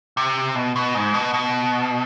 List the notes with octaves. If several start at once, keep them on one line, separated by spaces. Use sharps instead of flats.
C3
B2
B2
G#2
B2
B2